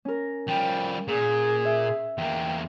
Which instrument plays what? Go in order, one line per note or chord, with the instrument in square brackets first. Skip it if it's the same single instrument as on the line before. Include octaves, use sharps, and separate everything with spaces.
[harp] C#4 A#4
[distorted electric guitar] F3 G3 [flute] G5
[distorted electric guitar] A#2 [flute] G#4
[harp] E5
[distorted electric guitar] E2 A#3 [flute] G5